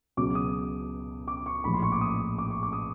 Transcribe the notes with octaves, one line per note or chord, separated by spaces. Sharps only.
C#2 B2 F#3 D6
D#6
D6
C#6
A#1 A2 F3 B5
C6
C#6
D6
D#6
D6
C#6
D6
D#6